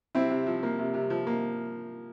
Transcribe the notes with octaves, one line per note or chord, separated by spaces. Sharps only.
C3 C4 E4
C3
F3
A#3
C3
C3
F3
A#3